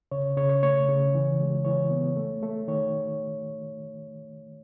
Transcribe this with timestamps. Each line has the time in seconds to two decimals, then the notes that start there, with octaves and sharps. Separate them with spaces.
0.11 C#3 C#5
0.37 C#3 C#5
0.49 C#5
0.63 A3 C#5
0.89 C#3
1.15 E3
1.40 G#3
1.65 E3 C#5
1.91 B3
2.16 A3
2.43 A3
2.68 D#3 C#5